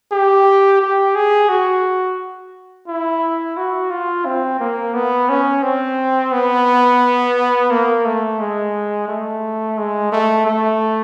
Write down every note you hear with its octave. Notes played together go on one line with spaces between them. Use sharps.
G4
G4
G#4
F#4
E4
F#4
F4
C4
A#3
B3
C#4
C4
B3
A#3
A3
G#3
A3
G#3
A3
A3